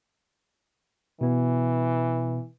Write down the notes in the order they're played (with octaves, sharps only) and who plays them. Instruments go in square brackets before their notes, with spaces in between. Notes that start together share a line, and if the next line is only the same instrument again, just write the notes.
[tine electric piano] B2 B3 [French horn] E3